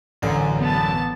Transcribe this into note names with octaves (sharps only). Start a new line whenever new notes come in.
A1 F#2 D3
B3 A5